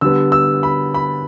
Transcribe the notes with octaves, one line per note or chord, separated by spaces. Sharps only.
D3 G3 B3 E6
E6
B5
B5